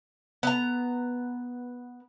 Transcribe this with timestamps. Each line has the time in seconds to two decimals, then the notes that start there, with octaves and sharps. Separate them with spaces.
0.43 B3 A#5